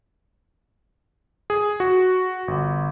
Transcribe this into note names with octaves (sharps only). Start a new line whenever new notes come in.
G#4
F#4
G1